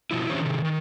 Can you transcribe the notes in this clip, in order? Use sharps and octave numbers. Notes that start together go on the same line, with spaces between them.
B2 F3 E4
E3 C#4 D4 G4 C5 C#5
C3 D#3
D#3